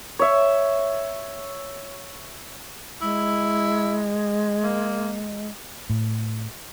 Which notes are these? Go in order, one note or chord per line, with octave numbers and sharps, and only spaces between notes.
C#5 E5
G#3 E4
A#3
A2